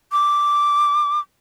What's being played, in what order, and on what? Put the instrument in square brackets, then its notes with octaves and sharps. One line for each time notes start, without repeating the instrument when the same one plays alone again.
[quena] D6